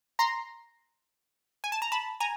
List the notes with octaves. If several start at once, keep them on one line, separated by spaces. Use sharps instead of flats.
A#5 C6
G#5
A5
A#5
A5 B5
G#5 A#5